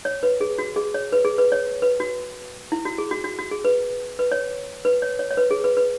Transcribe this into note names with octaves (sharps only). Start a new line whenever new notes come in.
C#5
B4
G#4
F#4
G#4
C#5
B4
G#4
B4
C#5
B4
F#4
E4
F#4
G#4
F#4
F#4
F#4
G#4
B4
B4
C#5
B4
C#5
C#5
C#5
B4
G#4
B4
B4